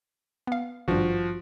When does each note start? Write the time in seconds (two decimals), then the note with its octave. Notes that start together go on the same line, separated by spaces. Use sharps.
0.47 B3 F5
0.88 G#1 G2 F3 F#4